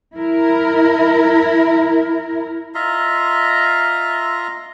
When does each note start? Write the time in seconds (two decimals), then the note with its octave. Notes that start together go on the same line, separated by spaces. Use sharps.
0.15 E4 A#4
2.75 F4 D#5 E5 A#5